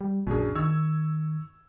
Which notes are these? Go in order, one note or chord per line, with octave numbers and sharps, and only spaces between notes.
G3
A#1 F#2 D4 G#4
D#3 C#6 E6 G#6